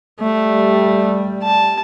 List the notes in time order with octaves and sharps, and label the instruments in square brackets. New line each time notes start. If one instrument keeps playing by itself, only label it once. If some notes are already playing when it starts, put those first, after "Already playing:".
[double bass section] G3 [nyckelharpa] A3
[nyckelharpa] A5